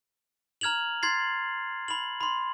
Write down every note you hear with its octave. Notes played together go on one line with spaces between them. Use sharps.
A#5 F6 G#6 F7 F#7
C6 G#6 A6 C7
B5 F#7
B5 C6